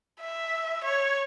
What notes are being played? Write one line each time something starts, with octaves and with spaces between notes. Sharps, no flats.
E5
C#5